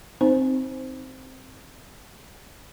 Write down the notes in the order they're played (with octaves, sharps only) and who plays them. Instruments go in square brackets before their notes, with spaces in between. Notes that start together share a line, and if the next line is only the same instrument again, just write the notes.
[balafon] C4 D#4 C5